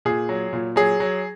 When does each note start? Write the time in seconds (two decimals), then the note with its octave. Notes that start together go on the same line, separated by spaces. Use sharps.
0.05 A#2 G#4
0.29 F#3
0.53 A#2
0.76 F#3 G#4
1.00 F#3